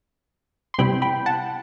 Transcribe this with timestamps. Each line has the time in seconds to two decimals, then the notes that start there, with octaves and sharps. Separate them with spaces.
0.74 C6
0.79 C3 G3 B3 E4 G5 B5
1.02 G5 B5
1.26 F#5 A5